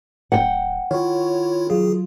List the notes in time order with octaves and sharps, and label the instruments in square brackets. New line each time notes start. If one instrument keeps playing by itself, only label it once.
[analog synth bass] D1 [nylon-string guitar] F#5 G5
[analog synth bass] D#3 [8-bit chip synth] E4 F4 [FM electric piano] C#5
[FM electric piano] F#3 F4 [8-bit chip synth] G#4